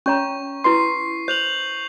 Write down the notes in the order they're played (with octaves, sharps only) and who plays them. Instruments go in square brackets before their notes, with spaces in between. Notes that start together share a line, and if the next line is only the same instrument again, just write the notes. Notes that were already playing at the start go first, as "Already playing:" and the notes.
[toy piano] C#4 C#5 A#5 [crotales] C#6
[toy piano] E4 B4 C6 [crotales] C7
[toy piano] C5 [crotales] G6 F7 F#7